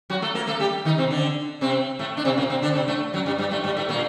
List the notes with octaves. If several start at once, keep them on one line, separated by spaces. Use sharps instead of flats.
F#3 F#4
A3 A4
A#3 A#4
A3 A4
G3 G4
D#3 D#4
C3 C4
D3 D4
C3 C4
A2 A3
D4
C3 C4
A#2 A#3
C3 C4
D3 D4
C3 C4
A2 A3
F#2 F#3
G2 G3
G2 G3
A2 A3
G2 G3
A2 A3
A#2 A#3